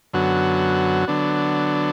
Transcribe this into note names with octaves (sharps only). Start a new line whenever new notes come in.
F#2 D3 F#3 B3 F#4
D3 F#3 B3 D4